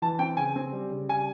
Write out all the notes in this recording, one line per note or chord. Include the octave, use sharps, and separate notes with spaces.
E3 A5
C4 G5
C#3 G#5
C4
G3
C#3
G3 G#5